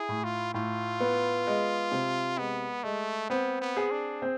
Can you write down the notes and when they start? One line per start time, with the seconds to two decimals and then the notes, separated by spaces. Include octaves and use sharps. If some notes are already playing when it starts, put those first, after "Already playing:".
Already playing: E4 G#4
0.09 A2
0.24 F4
0.54 A2 F4
1.00 B3
1.47 G#3
1.92 C3
2.38 G#3 B3
2.84 G#3 A3
3.30 B3 C4
3.61 B3
3.77 G#4
3.91 D4
4.22 C4